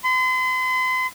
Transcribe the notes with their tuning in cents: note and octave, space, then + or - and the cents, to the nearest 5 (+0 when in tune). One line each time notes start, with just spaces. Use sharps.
C6 -40